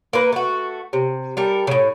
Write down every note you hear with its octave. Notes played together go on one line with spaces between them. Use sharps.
A#3 A#4 B4
A3 F#4
C3
G3 A4 A#4
A2 C#3